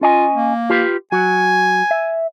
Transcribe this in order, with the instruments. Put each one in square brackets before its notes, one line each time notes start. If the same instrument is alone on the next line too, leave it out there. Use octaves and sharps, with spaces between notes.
[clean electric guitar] C#4 D#5 G#5 [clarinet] F4
[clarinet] A#3
[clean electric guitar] F4 G4 B4
[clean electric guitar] F#3 F#4 [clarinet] G#5
[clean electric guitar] E5